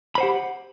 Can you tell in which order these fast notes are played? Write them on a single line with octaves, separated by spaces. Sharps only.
B5 C5 F#5 G4